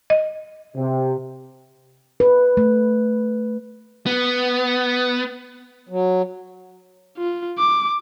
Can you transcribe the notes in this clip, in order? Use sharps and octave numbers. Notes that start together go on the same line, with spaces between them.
D#5
C3
B4
A3
B3
F#3
F4
D6